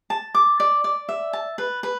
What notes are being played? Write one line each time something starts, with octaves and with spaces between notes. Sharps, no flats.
A5
D6
D5
D5
E5
A5
B4
B4